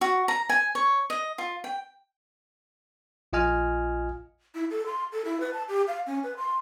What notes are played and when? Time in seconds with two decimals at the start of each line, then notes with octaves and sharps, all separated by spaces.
0.01 F#4
0.28 A#5
0.49 G#5
0.75 C#5
1.10 D#5
1.38 F4
1.64 G5
3.33 A#1 F4 D#5 G#5 F6
4.55 E4
4.70 A4
4.86 C6
5.12 A4
5.25 E4
5.40 B4
5.53 A5
5.68 G4
5.87 F5
6.06 C#4
6.23 B4
6.37 C6